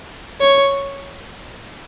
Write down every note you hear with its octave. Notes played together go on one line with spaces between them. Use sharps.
C#5